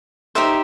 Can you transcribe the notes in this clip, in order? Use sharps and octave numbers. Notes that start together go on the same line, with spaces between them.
D#4 G4 C5 E5